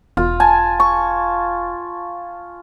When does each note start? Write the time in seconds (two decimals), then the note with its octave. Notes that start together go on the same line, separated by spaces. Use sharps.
0.17 E1 F4
0.40 G#5 A5
0.80 C#6